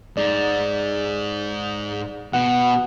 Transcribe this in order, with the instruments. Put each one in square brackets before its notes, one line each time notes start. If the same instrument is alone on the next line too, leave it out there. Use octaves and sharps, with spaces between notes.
[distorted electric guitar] G#2 [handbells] D5
[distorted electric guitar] B2 [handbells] F#5